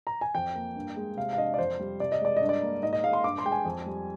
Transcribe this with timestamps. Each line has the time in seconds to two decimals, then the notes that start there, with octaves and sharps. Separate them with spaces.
0.07 A#5
0.21 G#5
0.35 F2 G5
0.55 A#3
0.76 G2
0.96 G#3
1.17 C3 F5
1.33 F5
1.37 D4 D#5
1.54 D5
1.58 F2 C5
1.79 G3
2.00 C3 D5
2.12 D#5
2.21 G#3 D5
2.37 G2 D#5
2.49 D5
2.61 A#3
2.82 G#2 D#5
2.93 D#5
3.04 G#3 F5
3.13 C6
3.24 G2 D6
3.38 C6
3.45 G#3 G5
3.52 G#5
3.65 F2
3.86 G3